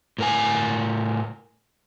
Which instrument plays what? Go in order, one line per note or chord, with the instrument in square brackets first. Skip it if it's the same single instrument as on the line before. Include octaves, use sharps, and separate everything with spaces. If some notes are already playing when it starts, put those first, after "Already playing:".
[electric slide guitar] A2 A#4 G#5